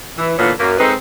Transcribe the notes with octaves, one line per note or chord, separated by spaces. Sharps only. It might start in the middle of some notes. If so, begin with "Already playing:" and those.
E3
A#2 D3 E3 B3 F4 C#5
F#2 A#3
G#3 C4 D#4 A4 B4